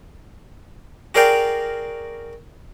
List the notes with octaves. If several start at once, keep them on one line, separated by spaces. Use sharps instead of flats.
F#4 G#4 A#4 D5 F5 G5